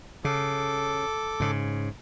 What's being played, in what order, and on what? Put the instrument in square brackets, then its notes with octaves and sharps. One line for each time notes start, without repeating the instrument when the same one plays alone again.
[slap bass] C#3 [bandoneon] A4 D6
[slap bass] G#2 C#3